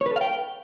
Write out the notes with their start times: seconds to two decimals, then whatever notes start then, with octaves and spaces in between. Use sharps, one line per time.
0.01 C#5
0.06 B4
0.11 A4
0.16 F5
0.21 G5